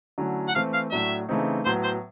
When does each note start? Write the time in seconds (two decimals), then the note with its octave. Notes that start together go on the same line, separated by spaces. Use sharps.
0.18 D3 F#3 A3 C#4 E4
0.48 F#5
0.55 E3 A3 C4 E4 F5
0.74 F5
0.92 A2 F#3 A3 D4 E5
1.29 C#3 E3 A3 C4 D#4
1.65 A2 F#3 B3 C5
1.84 C5